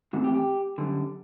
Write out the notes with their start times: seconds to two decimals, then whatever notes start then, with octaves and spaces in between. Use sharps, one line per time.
0.13 G#2 E3 A3 C4 F#4
0.24 G4
0.34 G4
0.78 F#2 D3 G3